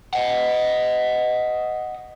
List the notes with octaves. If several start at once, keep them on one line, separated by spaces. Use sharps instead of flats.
D#5 F#5